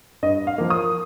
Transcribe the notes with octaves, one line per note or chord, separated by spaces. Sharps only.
G2 D#5
F5
F3 A#3
D#6